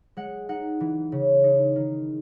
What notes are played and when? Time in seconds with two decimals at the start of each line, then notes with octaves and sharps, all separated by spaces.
0.17 G#3 F#5
0.49 D#4 F#5
0.80 E3
1.12 C#3
1.44 D#4
1.76 D#3